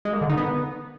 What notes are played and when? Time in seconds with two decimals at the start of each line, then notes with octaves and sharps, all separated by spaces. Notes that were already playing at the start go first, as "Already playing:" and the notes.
0.05 G#3
0.13 A#3
0.21 D3
0.29 D#4
0.37 B3